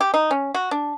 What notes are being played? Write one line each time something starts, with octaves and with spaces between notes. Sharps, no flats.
G4
D#4
C#4
F#4
D4